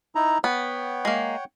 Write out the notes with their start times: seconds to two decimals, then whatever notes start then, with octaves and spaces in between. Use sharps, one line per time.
0.15 D#4 E4 A#5
0.44 B3 C#5 F#5 G5
1.05 G#3 A#3